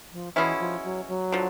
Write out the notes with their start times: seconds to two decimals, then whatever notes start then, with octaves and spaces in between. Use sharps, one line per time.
0.12 F3
0.36 B2 E3 G#3 C#4 E4
0.60 F3
0.84 F#3
1.08 F#3
1.32 D3 F3